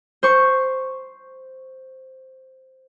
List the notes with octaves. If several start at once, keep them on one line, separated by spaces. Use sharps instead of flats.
C5 C#6